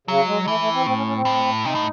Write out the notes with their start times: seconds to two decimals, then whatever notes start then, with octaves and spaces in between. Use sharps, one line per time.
0.07 C#3 F#3
0.27 G#3
0.42 G#3
0.47 E3 A3
0.60 A3
0.73 C4
0.86 A2 C4
0.96 C#4
1.07 C#4
1.16 C4
1.25 A2
1.65 C3 D#4
1.75 A2